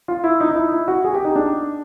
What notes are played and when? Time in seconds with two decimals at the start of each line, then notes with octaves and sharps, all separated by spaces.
0.08 F4
0.24 E4
0.40 D#4
0.51 D#4
0.55 E4
0.72 E4
0.88 F#4
1.04 G#4
1.14 G4
1.25 D#4
1.36 D4